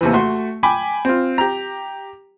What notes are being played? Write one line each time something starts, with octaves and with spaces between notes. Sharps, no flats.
D#2 C3 E3
A3 F#4 C6
G5 G#5 B5 D6
C4 F4
G4 A#5